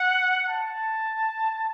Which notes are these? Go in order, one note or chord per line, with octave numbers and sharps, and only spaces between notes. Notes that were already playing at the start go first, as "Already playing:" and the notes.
Already playing: F#5
A5